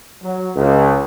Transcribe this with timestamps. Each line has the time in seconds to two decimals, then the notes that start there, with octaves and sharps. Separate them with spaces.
0.23 F#3
0.55 C#2